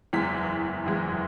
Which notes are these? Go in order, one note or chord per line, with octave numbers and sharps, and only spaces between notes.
F#1 E2 E3 G#3 B6
F#1 E2 E3 G#3